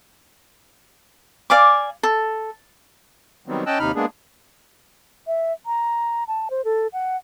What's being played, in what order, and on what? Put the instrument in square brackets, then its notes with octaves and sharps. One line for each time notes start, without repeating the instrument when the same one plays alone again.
[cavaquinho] D5 F5 G#5 D6
A4
[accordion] D#3 F#3 G3 B3 C4
C#4 D#5 G5 A5 E6 F#6
D#2 C3 D#4 B5 F6
G#3 A#3 B3 D4 G#4
[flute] E5
A#5
A5
C5
A4
F#5